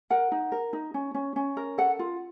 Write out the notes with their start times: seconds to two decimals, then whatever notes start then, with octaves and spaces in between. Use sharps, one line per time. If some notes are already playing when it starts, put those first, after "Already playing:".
0.10 A#4 F#5
0.32 D#4
0.52 A#4
0.73 D#4
0.94 C#4
1.14 C#4
1.36 C#4
1.57 A#4
1.78 A4 F#5
1.99 F4